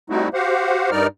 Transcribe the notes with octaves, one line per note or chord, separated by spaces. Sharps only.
G3 A3 C4 D#4 E4 F#4
F#4 G4 C5 F5 F#5
G2 G3 D#4 A#4 D5 F6